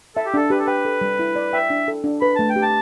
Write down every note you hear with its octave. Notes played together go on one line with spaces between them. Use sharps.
A4 E5
G4
D4 A4
G4 B4
A4
B4 G5
A4
G3
E4
D5
E5 G5
D4
A4
D4
B4 B5
A3 A5
G5
G4
A5